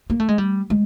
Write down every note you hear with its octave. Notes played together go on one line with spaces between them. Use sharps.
A#3
A3
G#3
G3
G#3